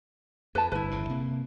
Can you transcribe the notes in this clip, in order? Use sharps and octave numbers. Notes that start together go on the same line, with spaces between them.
F2 B4 A5
G1 E4 B4
G1 E2 C#3
C3 A#3